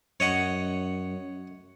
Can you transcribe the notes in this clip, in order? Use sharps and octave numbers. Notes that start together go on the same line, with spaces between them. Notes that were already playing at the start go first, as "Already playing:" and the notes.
F#2 C#5 D#5 F#5